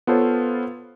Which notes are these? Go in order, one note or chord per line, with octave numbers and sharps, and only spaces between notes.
B3 F4 A4 C5 C#5